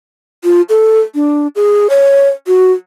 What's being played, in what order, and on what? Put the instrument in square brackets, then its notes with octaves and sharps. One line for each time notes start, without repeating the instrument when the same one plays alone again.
[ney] F4
A4
D4
G#4
C#5
F#4